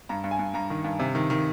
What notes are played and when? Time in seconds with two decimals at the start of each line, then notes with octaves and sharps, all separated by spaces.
0.09 G2 A#5
0.24 G2
0.31 G#5
0.39 G2
0.54 G2 A#5
0.70 D#3
0.84 G2
0.99 C3
1.15 D#3
1.30 D#3